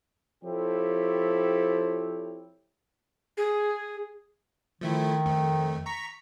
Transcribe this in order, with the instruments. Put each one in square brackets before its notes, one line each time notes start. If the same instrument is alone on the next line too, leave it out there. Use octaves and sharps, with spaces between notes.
[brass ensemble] F3 C4 E4 G4 A4 C#5
[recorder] G#4
[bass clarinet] D#3 [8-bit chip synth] F3 A3 E4
[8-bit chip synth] F2 A3
A#5 C#6 B6